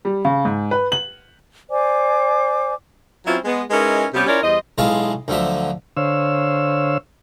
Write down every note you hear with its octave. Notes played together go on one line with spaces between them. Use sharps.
G3
C#3
G#2
B4
F#7
C5 D5 G#5 D6
F#3 C4 C#4 E4 F4
G#3 B3
G#3 C#4 D#4 E4 A#4 B4
C3 G3 B3 C#4 G4
C#4 E4 F4 A#4 C#5 D5
E2 G3 C5 D#5
B1 E3 G#3 F4 A5 C#6
D2 D3 F3 F#3 E5
D3 C5 C#5 F5 E6